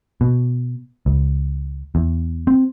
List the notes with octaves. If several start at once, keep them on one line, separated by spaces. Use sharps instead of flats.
B2
C#2
E2
C4